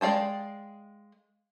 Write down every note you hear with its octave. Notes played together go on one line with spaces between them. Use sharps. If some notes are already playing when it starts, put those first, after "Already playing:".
G#3 D5 F5 G5 A5